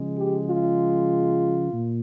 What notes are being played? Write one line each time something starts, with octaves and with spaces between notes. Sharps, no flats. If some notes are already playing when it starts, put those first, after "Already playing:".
Already playing: C#3 F3 G#3
G4
F4
A#2